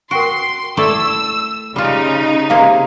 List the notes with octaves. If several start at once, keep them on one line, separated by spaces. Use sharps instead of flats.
F#4 A#4 G5 C6 D7
A3 E4 D5 E6
C#3 G3 D#4 F4
C3 A#3 G#4 F5 A#5 C6